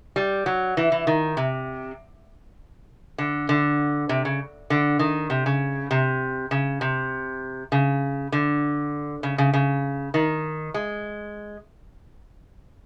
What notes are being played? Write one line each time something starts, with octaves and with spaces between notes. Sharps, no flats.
G3
F#3
E3
E3
D#3
C3
D3
D3
C3
C#3
D3
D#3
C3
C#3
C3
C#3
C3
C#3
D3
C#3
C#3
C#3
D#3
G#3